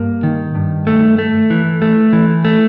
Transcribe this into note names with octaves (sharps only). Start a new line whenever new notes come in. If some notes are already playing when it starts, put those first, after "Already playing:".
Already playing: G2 A#3
D#3
G2
A3
A3
E3
A3
E3
A3